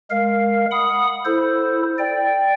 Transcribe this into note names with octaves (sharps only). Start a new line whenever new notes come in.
G#3 A#4 F5
F#5 B5 D#6
E4 A4 C5
D5 G5